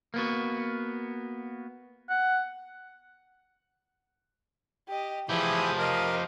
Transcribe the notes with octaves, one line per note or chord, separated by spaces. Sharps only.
A#3 B3 F#4
F#5
G4 D#5
E3 F3 E4 G4 G#4 D#6
A#4 D#5 F5